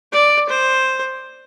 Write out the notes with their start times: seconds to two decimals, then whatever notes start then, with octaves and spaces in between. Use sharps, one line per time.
0.12 D5
0.49 C5